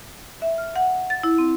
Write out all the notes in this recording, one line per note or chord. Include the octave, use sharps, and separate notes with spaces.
E5
F6
F#5
A6
E4
C4